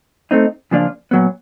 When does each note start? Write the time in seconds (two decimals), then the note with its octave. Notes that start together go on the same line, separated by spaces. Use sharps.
0.31 A3 C4 D#4
0.71 C#3 F3 A#3 D4 F4
1.11 A#2 F#3 B3